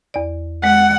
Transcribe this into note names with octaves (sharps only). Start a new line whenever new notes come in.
E2 D5
G#3 F#5